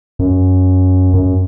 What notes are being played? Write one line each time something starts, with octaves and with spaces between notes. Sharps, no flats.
F#2
F#2